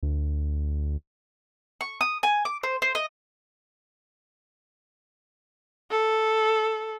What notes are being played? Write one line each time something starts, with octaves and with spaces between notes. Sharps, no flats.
D2
C#6
D#6
G#5
D6
C5
C5
D#5
A4